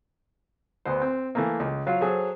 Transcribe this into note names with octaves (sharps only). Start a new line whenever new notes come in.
D2 B3 C5
C4
E3 A3 A#3
C#2
F#3 F4 F5
F#3 G#4 A4 C5